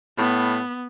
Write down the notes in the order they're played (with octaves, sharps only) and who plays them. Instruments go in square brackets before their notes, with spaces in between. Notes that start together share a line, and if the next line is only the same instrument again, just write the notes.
[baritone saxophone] A2 [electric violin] B3